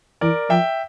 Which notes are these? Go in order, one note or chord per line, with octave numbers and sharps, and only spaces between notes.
E3 A#4 D5
F3 E5 G5